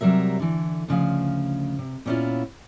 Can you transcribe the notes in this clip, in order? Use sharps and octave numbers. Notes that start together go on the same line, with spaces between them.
C3 F#3 G3 A#4 E5
D3 E3
D2 C#3 F3 F5
C3
A#2 B3 C#4 D4 E4 F4